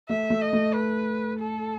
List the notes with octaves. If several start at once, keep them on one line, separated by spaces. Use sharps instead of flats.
A3 E5
A3
D#5
A3
B4
A4